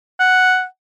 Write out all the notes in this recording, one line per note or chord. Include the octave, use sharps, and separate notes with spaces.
F#5